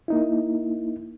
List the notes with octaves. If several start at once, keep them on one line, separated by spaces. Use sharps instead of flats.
A#3 D#4 E4